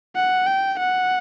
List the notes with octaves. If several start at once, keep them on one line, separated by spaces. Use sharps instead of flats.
F#5
G5
F#5